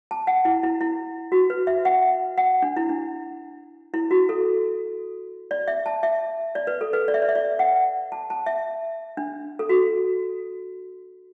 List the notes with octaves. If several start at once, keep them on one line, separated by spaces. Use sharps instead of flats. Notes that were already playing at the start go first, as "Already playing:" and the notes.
A5
F#5
E4
E4
E4
F#4
B4
E5
F#5
F#5
D4
E4
D4
E4
F#4
A4
D5
E5
A5
E5
D5
B4
A4
B4
D5
E5
D5
E5
D5
F#5
A5
A5
E5
D4
A4
F#4